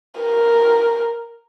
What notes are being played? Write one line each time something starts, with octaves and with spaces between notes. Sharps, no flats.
A#4